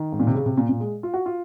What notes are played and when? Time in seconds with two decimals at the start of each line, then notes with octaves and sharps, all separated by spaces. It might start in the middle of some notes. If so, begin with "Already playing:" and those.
Already playing: D#3
0.12 G#2
0.20 A#2
0.27 C3
0.34 C#3
0.46 C3
0.58 A#2
0.69 A#2
0.80 G#3
1.03 F4
1.14 F#4
1.26 F4